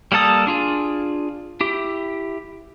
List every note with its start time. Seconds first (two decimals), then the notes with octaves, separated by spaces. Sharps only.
0.12 G3 A#3 A4 A5 D#6
0.47 D4 F4 G#4
1.61 E4 G4